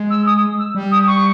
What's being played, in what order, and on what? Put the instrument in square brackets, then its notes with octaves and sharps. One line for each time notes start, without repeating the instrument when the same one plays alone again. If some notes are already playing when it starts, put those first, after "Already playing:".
Already playing: [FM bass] G#3
[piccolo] E6
D#6
E6
[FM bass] G3
[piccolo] D#6
C#6